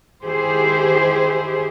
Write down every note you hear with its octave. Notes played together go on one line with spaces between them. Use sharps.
D#3 E4 G4 G#4 C5